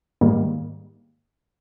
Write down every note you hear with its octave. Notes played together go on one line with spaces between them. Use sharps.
G#2 D#3 G3 A#3